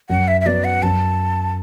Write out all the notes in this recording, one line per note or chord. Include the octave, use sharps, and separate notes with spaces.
F#2 F#5
E5
E5
F#3 B3 D5
F#5
F#2 A5